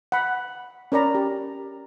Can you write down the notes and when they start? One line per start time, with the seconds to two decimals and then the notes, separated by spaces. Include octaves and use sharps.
0.12 F#5 B5
0.92 C#4 A#4 D5 A#5 B5
1.15 G4